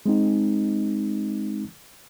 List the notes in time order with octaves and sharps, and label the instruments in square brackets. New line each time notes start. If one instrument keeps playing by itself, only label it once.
[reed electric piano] G#3 C4 D#4